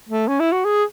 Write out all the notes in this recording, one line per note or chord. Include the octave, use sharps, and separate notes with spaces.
A3
C#4
E4
F#4
G#4